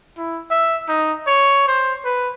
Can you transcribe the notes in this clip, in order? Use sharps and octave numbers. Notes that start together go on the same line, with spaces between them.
E4
E5
D#4
C#5
C5
B4